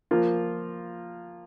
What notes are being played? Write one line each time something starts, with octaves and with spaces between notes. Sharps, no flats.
F3 A#3 F4